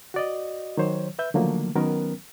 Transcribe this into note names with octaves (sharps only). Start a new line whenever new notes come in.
F#4 D5 D#5
D#3 F#3 C5 C#5
B4 E5 G6
D3 D#3 F3 F#3 A3 A#3
D#3 F#3 B3 C#4 A#4 B4